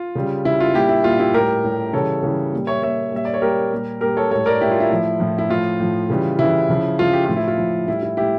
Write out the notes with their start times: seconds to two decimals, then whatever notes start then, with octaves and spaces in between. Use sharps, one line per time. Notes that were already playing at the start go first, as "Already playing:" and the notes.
Already playing: F4
0.15 C#3 G3
0.45 C#3 G3 E4
0.60 F4
0.74 A#2 G3 E4 G4
0.89 E4
1.04 A#2 G3 F4
1.19 E4 G4
1.34 A2 G3 G4 A#4
1.64 A2 G3
1.93 C#3 E3 G3 A4 C#5
2.23 C#3 E3 G3
2.53 A#2 G3
2.67 C#5 E5
2.83 A#2 G3 C#5 E5
3.12 A#2 G3 E5
3.25 D5
3.34 C#5
3.42 A#2 G3 G4 A#4
3.72 A#2 G3
4.01 A#2 G3 G4 A#4
4.17 A4 C#5
4.31 A2 G3 A4 C#5
4.46 A#4 D5
4.61 A2 G3 E4 G4
4.71 F4
4.80 E4
4.90 A2 F3
5.20 A2 F3
5.38 E4
5.50 A2 F3 F4
5.80 A2 F3
6.10 C#3 E3 G3
6.39 C#3 E3 G3 E4
6.70 C#3 F3
6.99 C#3 F3 F4
7.13 G4
7.25 A2 F3 F4
7.36 E4
7.48 F4
7.58 A2 F3
7.88 A2 G3 E4
8.03 E4
8.17 A2 G3 E4 G4